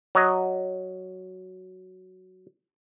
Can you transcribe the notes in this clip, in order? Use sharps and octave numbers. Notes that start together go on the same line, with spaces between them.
F#3 D#5